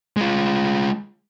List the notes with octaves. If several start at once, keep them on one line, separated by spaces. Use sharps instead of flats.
G#3 F4